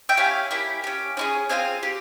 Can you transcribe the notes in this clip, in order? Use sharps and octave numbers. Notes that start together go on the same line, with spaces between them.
E5 G5
C#4 E4 G4 F5 G#5
A#3 E4 G4
C#4 G4
C#4 E4 G#4
C4 F4 G#4 F5 G#5
G4